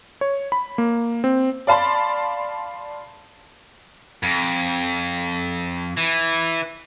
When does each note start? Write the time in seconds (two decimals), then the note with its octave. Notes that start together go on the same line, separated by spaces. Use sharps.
0.21 C#5
0.52 B5
0.78 A#3
1.24 C4
1.67 D5 F5 A5 B5 C6
4.23 F2
5.97 E3